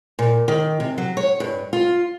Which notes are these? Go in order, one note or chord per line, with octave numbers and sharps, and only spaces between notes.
A#2
D#3
C3
F#3
C#5
G2
F4